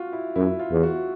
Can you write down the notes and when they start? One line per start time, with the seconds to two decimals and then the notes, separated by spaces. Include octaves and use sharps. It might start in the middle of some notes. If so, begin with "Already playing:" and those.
Already playing: F4 F#4
0.13 E4
0.36 F#2 E4
0.59 F4
0.71 E2
0.83 F#4